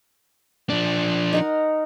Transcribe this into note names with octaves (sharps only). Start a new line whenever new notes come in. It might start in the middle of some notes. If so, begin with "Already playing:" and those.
F3 D4
D#4 A#4 F#5